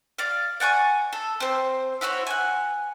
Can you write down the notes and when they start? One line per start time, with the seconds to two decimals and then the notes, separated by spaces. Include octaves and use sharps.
0.18 D5 F5
0.60 D5 F#5 G#5 C#6
1.13 A4
1.40 C4 C5
2.01 E4 F#4 C5 C#5
2.27 F#5 G#5